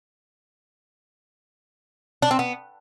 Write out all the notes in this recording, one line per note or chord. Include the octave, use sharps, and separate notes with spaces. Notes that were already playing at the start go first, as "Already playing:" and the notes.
D4
C4
B3